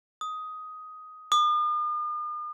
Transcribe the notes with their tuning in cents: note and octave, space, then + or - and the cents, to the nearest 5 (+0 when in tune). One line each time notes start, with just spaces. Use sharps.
D#6 +10
D#6 -45